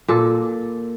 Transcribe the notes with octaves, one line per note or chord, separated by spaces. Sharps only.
A#2 A4